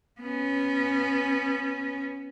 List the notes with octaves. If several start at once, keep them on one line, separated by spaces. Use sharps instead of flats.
B3 C#4